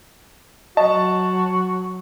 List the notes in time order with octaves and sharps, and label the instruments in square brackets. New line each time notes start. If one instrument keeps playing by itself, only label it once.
[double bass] F#3 [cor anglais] F#4 [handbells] D#5 [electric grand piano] A5